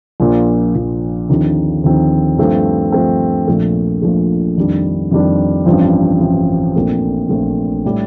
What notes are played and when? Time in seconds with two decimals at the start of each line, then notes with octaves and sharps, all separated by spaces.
0.20 A#1 A#2 F3
0.75 A#1 A#2 F3
1.29 D#2 D3 F3 C4 D#4
1.84 D#2 D3 F3 C4 D#4
2.38 G2 F3 A3 C4
2.92 G2 F3 A3 C4
3.47 A#1 A#2 F3 A3
4.02 A#1 A#2 F3 A3
4.57 F2 D#3 G3 D4
5.11 F2 D#3 G3 D4
5.66 A1 G2 F3 C4
6.21 A1 G2 F3 C4
6.75 A#1 A#2 A3 C4
7.29 A#1 A#2 A3 C4
7.85 A2 G3